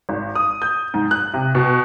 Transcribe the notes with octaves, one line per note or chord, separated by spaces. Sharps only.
G#1
D#6
G6
G#2
F#6
C3
B2